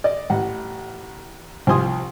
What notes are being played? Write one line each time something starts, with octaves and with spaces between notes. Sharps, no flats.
D5 D#5
A1 F#5
C2 F3 G#5 C6 D#6